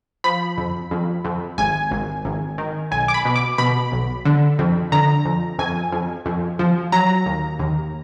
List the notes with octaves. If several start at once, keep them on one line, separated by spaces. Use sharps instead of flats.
F3 B5
F2
F2
F2
G#1 G#5
G#1
G#1
D#3
B1 G#5
D6
B5
B2
D6
B2 B5
B1
D3
F2
D3 A#5
F2
F2 G#5
F2
F2
F3
F#3 A#5
D#2
D#2